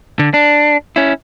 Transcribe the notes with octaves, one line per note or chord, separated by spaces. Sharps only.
D3
D4
C#4 E4